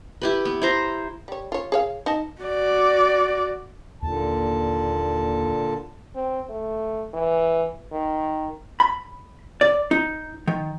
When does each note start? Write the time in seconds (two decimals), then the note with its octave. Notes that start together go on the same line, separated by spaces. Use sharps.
0.22 E4 G4 B4
0.45 B3
0.62 E4 C5 A#5
1.28 G3 C#5
1.52 F4 C#5
1.72 G#4 C#5 F5
2.06 D#4 D#5 A5
2.42 F#4 D5
4.02 D#2 A#2 D3 A5
6.15 C4
6.50 A3
7.14 E3
7.92 D#3
8.80 B5
9.61 D5
9.91 D#4
10.47 D#3